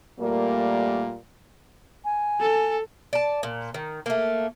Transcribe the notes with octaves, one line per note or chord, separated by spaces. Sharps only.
A#2 G3 A3 A#3
G#5
A4
D5 A5
A#2
D#3
A3 A#3